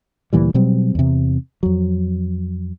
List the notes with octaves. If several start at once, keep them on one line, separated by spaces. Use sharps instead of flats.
D2 A#2 E3 G3
B2 F#3 G3 C4
E2 C3
F2 F#3